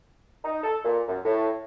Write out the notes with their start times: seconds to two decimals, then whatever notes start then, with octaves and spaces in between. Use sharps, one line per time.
0.45 D#4
0.63 A4
0.85 A#2
1.08 F#2
1.25 A2